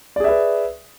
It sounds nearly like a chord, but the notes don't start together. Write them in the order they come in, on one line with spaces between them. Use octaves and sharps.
D5 G#4 E5 B4